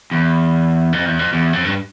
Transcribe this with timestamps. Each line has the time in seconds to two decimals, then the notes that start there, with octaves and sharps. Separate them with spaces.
0.11 E2
0.93 F2
1.06 E2
1.19 F2
1.33 E2
1.53 F2
1.65 G2